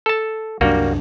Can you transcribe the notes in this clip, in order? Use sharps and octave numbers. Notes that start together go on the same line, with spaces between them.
A4 A5
C2 F#2 G3 A#3 D4 F#4